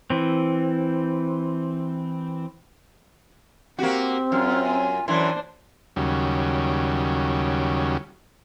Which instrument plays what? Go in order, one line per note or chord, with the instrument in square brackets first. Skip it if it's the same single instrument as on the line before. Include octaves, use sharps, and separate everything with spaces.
[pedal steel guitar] E3 C4
[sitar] A#3 F#4 [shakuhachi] C4 [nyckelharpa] G4
[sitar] F#2 [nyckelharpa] F4 [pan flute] F6
[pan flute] G#5
[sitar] F#2 E3 [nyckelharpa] D4 C5 [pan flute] C6
[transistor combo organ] D#2 C#3 F#3 G3